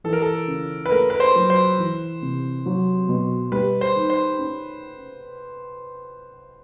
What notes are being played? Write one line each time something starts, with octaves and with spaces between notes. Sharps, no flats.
E3 A4
A#4
A4
C#3
B4
A3 A#4
B4
C5
F#3
C5
E3
C3
F#3
B2
G3 B4
C5
D#3
C5
C#4